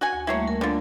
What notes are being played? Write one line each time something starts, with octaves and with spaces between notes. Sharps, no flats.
F#4 F#5 G#5
D2
G3 A3 A#3 E4 F#4 C#5
A#4
D3 F4